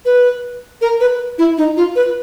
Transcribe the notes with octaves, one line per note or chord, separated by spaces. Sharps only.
B4
A#4
B4
E4
D#4
F4
B4